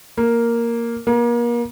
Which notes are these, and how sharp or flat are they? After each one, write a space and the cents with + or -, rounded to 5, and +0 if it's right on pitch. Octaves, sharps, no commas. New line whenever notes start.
A#3 +0
A#3 +35